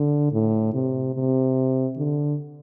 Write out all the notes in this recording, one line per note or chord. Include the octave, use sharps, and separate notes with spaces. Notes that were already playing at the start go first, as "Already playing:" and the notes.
Already playing: D3
A2
C3
C3
D3